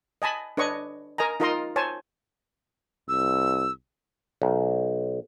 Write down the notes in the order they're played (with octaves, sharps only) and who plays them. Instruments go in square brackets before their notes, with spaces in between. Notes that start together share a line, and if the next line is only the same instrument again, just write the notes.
[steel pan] D#5 G#5 A5 B5
D4 B4 C#5 D#5 C#6
A#4 D#5 G#5 A#5
D#4 F4 A#4 D#5 A#5 C6
C5 C#5 G#5 A5
[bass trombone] C2 [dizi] E6
[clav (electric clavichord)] B1